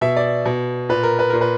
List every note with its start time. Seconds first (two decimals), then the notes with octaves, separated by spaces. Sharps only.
0.01 B2 E5
0.16 D5
0.45 B2
0.89 A#2 B4
1.03 A#4
1.19 B4
1.30 A#2 A#4
1.41 B4